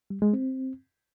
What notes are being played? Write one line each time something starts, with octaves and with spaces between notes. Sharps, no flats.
G3
G#3
C4